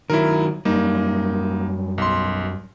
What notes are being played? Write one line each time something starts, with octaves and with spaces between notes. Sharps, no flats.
D#3 F#3 E4 A#4
F#2 G3 A#3 D#4
B1 C6